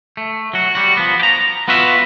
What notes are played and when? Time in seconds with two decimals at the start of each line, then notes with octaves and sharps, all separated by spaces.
0.17 A3
0.53 F#3 F#4
0.75 G3 F#4
0.97 F3 B3
1.19 G4 A#5
1.68 B3 F4 F#4 B4 E5